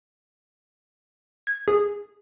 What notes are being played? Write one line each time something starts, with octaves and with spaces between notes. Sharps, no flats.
G#6
G#4